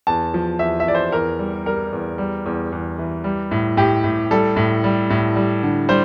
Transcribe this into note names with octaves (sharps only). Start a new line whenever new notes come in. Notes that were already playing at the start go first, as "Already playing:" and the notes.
E2 A5
F3
E2 E5
E5
E2 D5
C5
E2 A#4
G3
G3 A#4
E2
G3
E2
E2
E3
G3
A2
A2 G4
A2
G3 A4
A2
G3
A2
G3
D3
G3 C5